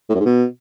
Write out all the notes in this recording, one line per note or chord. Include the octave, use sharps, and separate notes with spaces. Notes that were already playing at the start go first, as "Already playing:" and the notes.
A2
F#2
G#2
B2